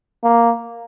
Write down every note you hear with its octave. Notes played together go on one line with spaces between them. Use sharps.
A#3